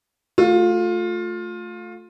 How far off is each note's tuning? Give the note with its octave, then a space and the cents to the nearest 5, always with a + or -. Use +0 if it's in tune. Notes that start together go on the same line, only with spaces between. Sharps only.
A3 +0 F4 +20